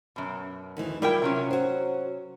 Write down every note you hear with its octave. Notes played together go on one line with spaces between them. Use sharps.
F#2 B2
D2 D#3 E3
G3 E4 F4 A#4 E5 G5
C3 F#3 C#4
F#4 C5